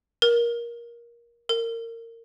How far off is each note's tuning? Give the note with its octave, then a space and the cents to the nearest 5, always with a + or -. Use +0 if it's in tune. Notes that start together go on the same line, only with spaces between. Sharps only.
A#4 +15
A#4 -25